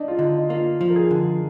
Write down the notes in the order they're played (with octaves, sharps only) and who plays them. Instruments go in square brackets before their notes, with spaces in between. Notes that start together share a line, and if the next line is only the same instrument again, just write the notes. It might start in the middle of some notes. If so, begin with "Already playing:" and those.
Already playing: [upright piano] D4 D#4
F4
[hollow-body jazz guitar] D3 [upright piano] D#4
[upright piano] D#4
[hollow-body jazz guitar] A#3 [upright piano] F4
[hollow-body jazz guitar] F3
[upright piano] A#4
G#4
[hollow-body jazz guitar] D3